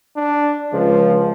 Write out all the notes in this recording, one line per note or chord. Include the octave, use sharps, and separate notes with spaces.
D4
C#2 F3